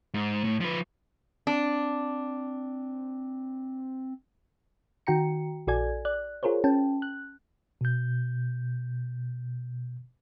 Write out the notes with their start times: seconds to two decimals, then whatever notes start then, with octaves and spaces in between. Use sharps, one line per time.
0.14 G#2
0.44 A2
0.61 F3 B4
1.47 C4 D4
5.07 D#3 F#4 G5 A#5 C#7
5.67 A#1 F#4 A4 D5 G#5 G#6
6.05 D5 F#6
6.43 F4 G#4 A#4 C5 C#5
6.64 C#4 G5 A5
7.02 F#6
7.81 B2 G6